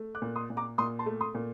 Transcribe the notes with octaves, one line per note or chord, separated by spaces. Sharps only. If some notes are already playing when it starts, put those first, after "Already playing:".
Already playing: A3
D6 F#6
A#2
C6 D#6
A#2
A#5 D6
A#2 C6 D#6
A5 C6
A3
C6 D#6
A#2